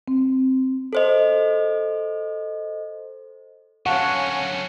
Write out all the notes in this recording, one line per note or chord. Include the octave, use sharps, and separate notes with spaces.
C4
A4 C5 D#5
D3 F#3 C#4 F5 F#5 A5 C#6